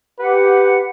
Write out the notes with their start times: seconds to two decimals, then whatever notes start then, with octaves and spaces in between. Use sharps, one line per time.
0.19 G4 B4 F#5